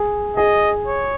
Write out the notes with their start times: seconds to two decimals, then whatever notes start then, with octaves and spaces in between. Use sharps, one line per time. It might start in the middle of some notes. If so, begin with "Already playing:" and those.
Already playing: G#4
0.37 G#4 D#5
0.87 C#5